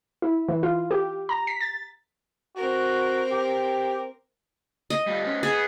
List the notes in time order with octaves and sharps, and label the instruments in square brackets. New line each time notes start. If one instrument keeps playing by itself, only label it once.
[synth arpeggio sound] E4
E3
F4
G4
A#5
B6
A6
[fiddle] C4 A#4 [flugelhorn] F#4
[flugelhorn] G4
[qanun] D#5
[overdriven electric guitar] G3 F4
B3 C#4
[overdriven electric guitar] B3 [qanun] G#4